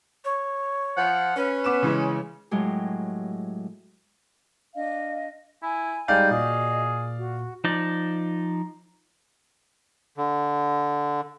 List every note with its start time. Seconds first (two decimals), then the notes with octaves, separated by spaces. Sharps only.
0.25 C#5
0.97 F3 F#5
1.36 C#4 B4
1.64 B3 D6 E7
1.82 C#3 E3 G#3
2.51 A2 F#3 G#3 G4
4.74 D4 D#5 F5
5.62 E4 G#5
6.08 G3 G#3 D#4 D5 F5 G5
6.31 A#2 F#4 G#4 D#5
7.18 F#4
7.64 F3 D#4 D5
10.18 D3